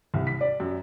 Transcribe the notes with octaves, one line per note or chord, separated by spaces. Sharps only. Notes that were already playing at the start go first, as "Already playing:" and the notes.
C2
B6
D5
F#2